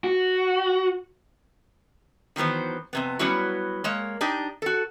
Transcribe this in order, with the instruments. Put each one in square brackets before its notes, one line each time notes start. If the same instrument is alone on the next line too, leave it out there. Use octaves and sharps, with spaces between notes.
[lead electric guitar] F#4
[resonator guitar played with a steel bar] D#3 E3 F#3 B3 C5
F2 C3 B3
F#3 G3 B3 C#4 E4 F#4
G#3 A#3 C#5
D4 D#4 G4
F#4 A4